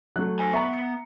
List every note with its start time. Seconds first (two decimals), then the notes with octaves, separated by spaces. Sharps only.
0.16 F#3 A3 F#6
0.39 C5 G#5
0.53 B3 E5 A#5 C#6
0.73 C#7